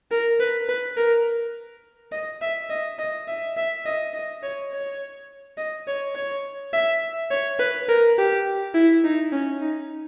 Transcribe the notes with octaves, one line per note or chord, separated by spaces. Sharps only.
A#4
B4
B4
A#4
D#5
E5
D#5
D#5
E5
E5
D#5
D#5
C#5
C#5
D#5
C#5
C#5
E5
C#5
B4
A#4
G4
E4
D#4
C#4
D#4